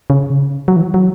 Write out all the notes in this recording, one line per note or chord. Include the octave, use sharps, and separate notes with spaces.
C#3
F#3
E3
F#3